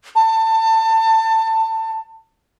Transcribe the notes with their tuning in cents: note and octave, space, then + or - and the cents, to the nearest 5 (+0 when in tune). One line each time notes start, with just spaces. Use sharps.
A5 +25